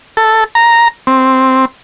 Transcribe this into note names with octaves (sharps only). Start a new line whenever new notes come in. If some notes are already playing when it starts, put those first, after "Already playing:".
A4
A#5
C4